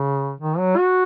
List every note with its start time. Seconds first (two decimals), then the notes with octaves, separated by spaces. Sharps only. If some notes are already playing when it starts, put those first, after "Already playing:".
Already playing: C#3
0.41 D#3
0.59 F#3
0.77 F#4